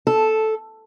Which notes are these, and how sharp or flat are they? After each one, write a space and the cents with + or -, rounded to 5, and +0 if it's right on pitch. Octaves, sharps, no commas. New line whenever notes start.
A4 -5